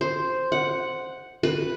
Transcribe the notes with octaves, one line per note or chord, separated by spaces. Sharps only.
C5
F#5
B4